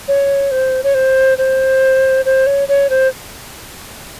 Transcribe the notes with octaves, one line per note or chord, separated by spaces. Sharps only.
C#5
C5
C#5
C5
C5
C5
C#5
C#5
C5